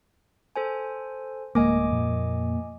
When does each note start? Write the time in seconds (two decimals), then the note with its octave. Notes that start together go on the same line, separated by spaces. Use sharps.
0.56 A4 C5 G#5
1.55 D1 D2 G#3 A#3 D#5 G#5 D6
1.90 F2 A#2 F3